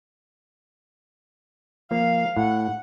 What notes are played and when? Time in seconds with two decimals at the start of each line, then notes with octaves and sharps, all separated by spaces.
1.91 F3 A#3 F5
2.37 A2 F#5